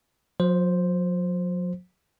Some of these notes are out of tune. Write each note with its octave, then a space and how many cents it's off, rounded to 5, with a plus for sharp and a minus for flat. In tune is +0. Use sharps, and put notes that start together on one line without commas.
F#3 -45 C5 +0